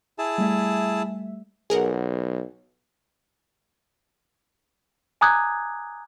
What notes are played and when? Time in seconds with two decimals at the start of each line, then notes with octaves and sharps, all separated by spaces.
0.18 E4 G#4 A5
0.38 G3 A3 E5
1.70 B1 G#4 A#4 F#5
5.21 G#5 A#5 D6 D#6 F#6 G#6